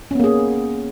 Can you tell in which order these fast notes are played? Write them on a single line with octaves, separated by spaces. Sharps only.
C#4 B3 A#3 G#4